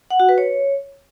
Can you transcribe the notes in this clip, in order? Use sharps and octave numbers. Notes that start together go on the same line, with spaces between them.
F#5
F#4
B4
C#5